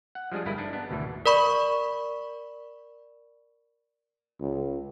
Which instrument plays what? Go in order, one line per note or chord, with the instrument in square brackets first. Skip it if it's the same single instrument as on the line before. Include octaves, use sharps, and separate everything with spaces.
[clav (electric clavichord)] F#5
F3 G3 G#3 D4 G#4
G1 G2 E4 A#4 B4 D#5
D4 D#4
B3 D4
G#1 D2 B2 E3
[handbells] A#4 D5 B5 C#6
[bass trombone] C#2